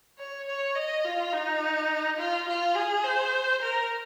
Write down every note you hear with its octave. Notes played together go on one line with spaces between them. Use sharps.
C#5
C#5
D#5
F4
D#4
F4
F4
G#4
C5
A#4